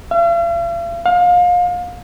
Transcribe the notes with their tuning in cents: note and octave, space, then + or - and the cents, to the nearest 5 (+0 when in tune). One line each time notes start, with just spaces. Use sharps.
F5 -45
F5 +30